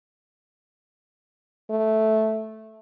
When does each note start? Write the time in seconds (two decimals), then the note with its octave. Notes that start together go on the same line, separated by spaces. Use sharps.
1.70 A3